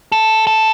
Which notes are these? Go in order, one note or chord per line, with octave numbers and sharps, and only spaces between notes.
A4
A4